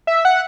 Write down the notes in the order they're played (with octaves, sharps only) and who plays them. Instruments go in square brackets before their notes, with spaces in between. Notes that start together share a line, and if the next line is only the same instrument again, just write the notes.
[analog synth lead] E5
F#5